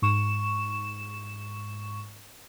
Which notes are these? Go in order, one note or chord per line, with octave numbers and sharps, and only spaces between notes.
G#2 C#6 E7